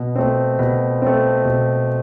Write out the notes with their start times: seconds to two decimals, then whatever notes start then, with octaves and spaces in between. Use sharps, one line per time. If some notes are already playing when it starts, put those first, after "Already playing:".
Already playing: B2
0.16 A3 C4
0.59 B2
1.02 A3 C4
1.45 B2